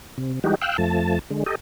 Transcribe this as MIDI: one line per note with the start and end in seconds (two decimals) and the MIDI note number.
0.18 0.39 48
0.44 0.55 52
0.44 0.55 55
0.44 0.55 56
0.44 0.55 63
0.44 0.55 66
0.44 0.55 67
0.61 0.77 77
0.61 0.77 79
0.61 0.77 88
0.61 0.77 90
0.78 1.19 41
0.78 1.19 53
0.78 1.19 57
0.78 1.19 81
1.31 1.44 50
1.31 1.44 56
1.46 1.55 67
1.46 1.55 69
1.46 1.55 75